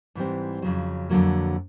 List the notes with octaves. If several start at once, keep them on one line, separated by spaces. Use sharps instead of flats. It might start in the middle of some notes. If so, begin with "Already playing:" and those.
G#2 E3 G3 C4
F2 C#3 F#3
F2 D3 F#3 A#3